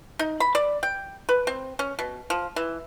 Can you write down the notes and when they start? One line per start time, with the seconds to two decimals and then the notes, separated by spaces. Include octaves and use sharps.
0.19 D#4
0.40 B5
0.55 D5
0.83 G5
1.29 B4
1.47 C4
1.79 C#4
1.99 B2
2.30 F3
2.56 E3